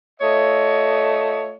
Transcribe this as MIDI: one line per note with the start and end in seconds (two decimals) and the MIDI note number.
0.20 1.54 57
0.20 1.54 65
0.20 1.54 73
0.20 1.54 75